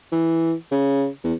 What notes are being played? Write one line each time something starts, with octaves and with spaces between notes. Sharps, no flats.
E3
C#3
E2